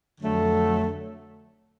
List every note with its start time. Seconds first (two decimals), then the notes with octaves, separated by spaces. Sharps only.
0.20 F2 D3 F#3 A3